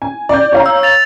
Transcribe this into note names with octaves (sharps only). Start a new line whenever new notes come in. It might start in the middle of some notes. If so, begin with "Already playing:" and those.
G#5
D5 G6
C#5 F5 A#5
E6
A6 F7